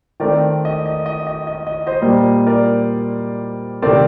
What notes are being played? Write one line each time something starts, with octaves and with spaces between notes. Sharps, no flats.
D#3 A3 C4 A#4 D5
D#5
D#5
D#5
D#5
D#5
D#5
C5 D#5
A#2 G3 A#3
A#4 D5
C3 D#3 A3 C4 A#4 D5